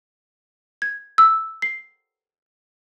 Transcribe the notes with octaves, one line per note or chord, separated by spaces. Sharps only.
G#6
E6
C7